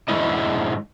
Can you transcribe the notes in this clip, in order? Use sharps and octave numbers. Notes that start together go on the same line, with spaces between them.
G#2 D3 G#3 E4 D#5